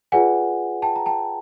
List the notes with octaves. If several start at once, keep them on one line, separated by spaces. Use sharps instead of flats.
F4 G#4 B4 D5 F#5 G#5
G5 A5
A#5
G5 A5